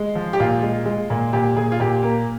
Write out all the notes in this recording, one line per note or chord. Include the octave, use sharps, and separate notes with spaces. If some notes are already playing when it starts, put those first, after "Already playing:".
Already playing: G#3
F3
G4
A#2 F4
G#3
G#3
A#2
A#2 G4
A#2 G#4
F4
A#2 G4
A#3